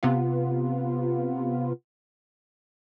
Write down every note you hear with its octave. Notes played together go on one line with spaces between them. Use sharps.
C3 B3 F4